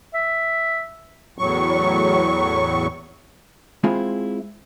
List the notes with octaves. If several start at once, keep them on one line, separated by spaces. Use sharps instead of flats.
E5
E2 A2 F#3 C#6
G#3 C4 E4 F4 G#4